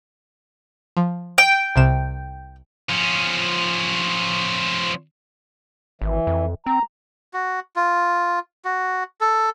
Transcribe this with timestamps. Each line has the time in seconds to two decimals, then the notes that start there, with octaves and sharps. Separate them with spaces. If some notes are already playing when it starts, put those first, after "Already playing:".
0.97 F3
1.38 G5
1.76 C2 C3 E7
2.90 F3 C#4
6.02 G#1 E3
6.27 F2
6.66 C4 A#5
7.34 F#4
7.76 F4
8.65 F#4
9.21 A4